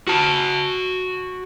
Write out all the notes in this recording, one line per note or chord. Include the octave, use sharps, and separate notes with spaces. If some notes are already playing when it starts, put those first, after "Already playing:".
F#4 A5